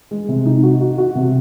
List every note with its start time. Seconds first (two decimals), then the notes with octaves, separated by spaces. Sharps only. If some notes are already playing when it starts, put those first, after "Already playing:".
0.11 G#3
0.28 C3
0.46 D#4
0.63 F#4
0.81 F#4
0.98 F#4
1.15 C3